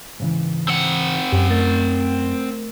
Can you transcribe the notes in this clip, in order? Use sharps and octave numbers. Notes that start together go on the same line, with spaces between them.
G#2 C#3 E3
C4 F#5
F#2 G4 G5
A3 A#4 A6